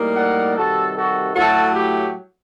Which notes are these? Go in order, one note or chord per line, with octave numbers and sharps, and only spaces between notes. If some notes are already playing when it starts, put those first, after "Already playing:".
Already playing: A2 G3 A#3 D#4
D5 F#5
C3 D#3 G3 F#4 A4
F#4 A4
A2 F#3 A3 F#4 A4
G4